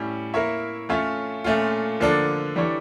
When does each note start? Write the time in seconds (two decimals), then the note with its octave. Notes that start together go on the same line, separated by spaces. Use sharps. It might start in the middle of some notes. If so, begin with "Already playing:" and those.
Already playing: A2 G3 C#4
0.34 A#3 E4 A#4 C#5 E5
0.89 A3 C#4 F4 C#5 E5
1.44 A#2 A3 C#4 F4
2.00 D3 F3 A#3 D4 A4
2.56 E3 G3 D4 A4 C#5